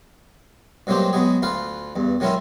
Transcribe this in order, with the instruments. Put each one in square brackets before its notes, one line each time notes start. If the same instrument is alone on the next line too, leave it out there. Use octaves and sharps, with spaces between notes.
[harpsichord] G2 F#3 G#3 A#3 C4 G4
F#3 G#3 B3 G#4
D2 F4 B4 F5
E2 G2
D#3 F#3 G#3 C#4 E4 F4